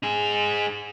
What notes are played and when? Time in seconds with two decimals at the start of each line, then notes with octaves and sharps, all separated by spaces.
0.03 D#4 G#4